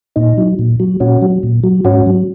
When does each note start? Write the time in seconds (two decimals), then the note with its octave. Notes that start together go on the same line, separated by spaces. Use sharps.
0.16 A#2 D#4
0.37 F#3
0.59 A#2
0.80 F#3
1.00 A#2 C#4 F#4
1.22 F#3
1.43 A#2
1.64 F#3
1.85 G#2 C#4 F#4
2.06 F#3